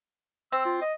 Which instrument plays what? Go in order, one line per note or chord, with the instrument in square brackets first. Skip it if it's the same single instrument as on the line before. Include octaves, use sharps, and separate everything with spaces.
[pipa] C4 [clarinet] E6
[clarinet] F4
D#5